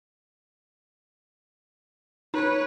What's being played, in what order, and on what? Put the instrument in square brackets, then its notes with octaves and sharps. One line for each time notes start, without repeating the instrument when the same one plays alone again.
[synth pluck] D#4 [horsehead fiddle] B4 C#5